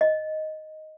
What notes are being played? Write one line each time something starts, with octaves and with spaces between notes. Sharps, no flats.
D#5